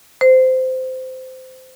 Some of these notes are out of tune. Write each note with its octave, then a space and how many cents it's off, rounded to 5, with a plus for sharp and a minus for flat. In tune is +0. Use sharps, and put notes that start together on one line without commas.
C5 -20